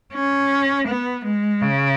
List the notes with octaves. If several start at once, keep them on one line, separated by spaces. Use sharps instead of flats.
C#4
B3
G#3
C#3